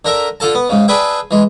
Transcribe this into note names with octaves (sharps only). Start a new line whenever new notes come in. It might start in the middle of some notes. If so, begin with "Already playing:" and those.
D3 A#4 E5
D3 F4 A4 A5
B3
G#2 C#3
D4 G#4 B4 E5 G5
E3 G#3